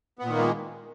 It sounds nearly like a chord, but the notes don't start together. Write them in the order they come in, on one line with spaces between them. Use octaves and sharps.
B3 A#2 D#3 A#3 G#3